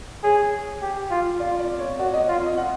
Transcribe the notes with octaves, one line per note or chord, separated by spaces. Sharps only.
G#4 C#5
G4
F4
F4 D5
D5
C#5
F#4 D5
D#5
F4
D#5
F#5